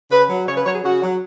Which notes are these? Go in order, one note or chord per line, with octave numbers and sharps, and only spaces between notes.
C#3 B4
F#3
C#3 C#5
B4
F#3 C#5
G#4
C#3 F#4
F#3